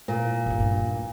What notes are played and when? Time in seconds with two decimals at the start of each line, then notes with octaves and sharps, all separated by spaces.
0.08 A#2
0.46 G1 D3
0.60 G2